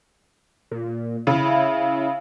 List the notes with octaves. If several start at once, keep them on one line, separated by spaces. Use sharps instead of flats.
A#2
C#3 E4